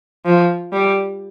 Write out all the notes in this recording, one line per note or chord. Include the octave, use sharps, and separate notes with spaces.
F3
G3